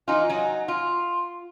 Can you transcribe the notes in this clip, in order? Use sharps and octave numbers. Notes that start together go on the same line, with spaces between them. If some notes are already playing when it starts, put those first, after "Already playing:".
E3 D#4 F4 G#5
F#3 D#4
F4 C6